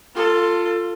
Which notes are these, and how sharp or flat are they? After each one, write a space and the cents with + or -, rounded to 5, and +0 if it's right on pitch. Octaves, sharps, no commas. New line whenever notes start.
F4 +0 A4 +20